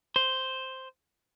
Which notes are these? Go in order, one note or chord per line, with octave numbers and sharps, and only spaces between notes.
C5